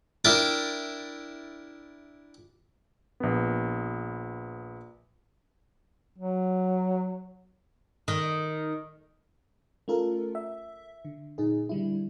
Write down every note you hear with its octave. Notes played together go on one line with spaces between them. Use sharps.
D4 E4 A#4 G5 A5
A#1 B3
F#3
D#3
A3 C#4 F4 A4 A#4
E5
D3
A#2 D#4 G#4
D3 G3 E4